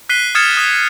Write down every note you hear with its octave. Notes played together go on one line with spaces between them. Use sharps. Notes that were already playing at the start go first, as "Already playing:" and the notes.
F#6 B6 C7 D#7 G7
D#6 F6 G#6 A6 C#7 E7
D#6 B6